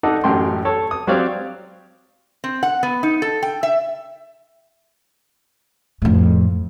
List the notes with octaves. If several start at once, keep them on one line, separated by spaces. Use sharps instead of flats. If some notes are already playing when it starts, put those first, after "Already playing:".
D4 D#4 A4 F#5
A1 F#2 A2 G5 C6
A4 C#5
D#6
F#3 C4 G4 C#5 D5 F5
C4
F#5
B3
D#4
A4
G5
E5
F2 A2